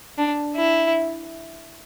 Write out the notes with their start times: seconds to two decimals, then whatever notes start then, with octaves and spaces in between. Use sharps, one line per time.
0.18 D4
0.55 E4